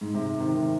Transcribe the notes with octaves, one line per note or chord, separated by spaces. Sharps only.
G#2
G#2 C3
C3 D#3
C3 D#3